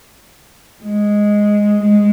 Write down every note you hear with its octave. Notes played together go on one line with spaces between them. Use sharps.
G#3
G#3